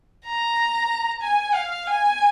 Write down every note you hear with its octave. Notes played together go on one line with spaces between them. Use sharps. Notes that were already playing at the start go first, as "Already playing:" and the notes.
A#5
G#5
F5
G#5